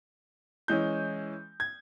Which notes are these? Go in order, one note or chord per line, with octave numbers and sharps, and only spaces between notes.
E3 G#3 C#4 G6
G#6